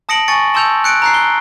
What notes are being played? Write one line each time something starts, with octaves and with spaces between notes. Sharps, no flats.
A5 D#6 A#6 C#7 D7 F#7
G#5 C#6 A6 C#7
A5 C6 E6 G6 C#7 F7
F#6 C#7 D7
A#5 F#6 C7
G7